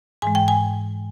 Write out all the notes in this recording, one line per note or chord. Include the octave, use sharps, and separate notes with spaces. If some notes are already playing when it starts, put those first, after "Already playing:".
G#2 E3 G#3 G#5
G5
G#5